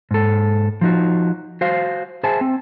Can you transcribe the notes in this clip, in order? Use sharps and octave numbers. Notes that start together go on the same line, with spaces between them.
G#2 A4
F3 D#4 F#4
F#4 C5 F5
G#4 C5 E5 G#5 A5
C4